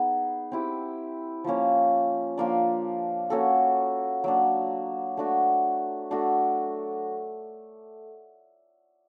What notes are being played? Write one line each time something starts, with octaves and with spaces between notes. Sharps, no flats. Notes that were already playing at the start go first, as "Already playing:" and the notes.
Already playing: B3 D#4 G#4
C4 E4 G4
F3 A#3 C#4
F3 A#3 D4
A#3 C#4 F#4 A4
F#3 A#3 D4
A3 D4 F#4
A3 D4 F#4 A4